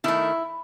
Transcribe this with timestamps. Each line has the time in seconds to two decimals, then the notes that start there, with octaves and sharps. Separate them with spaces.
0.04 D#3 A3 E4